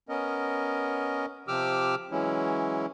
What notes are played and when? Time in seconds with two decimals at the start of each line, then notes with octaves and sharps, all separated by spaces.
0.09 B3 C#4 A#4 D#5
1.48 C3 F3 G4 D6 E6 F6
2.11 E3 F#3 G#3 C#4 E4